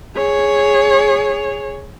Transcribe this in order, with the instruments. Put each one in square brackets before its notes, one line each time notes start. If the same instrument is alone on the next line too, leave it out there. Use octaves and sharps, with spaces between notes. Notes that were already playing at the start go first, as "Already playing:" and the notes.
[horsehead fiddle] G#4 C#5